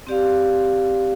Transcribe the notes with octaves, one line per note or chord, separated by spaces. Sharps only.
C4 G4 D5 F5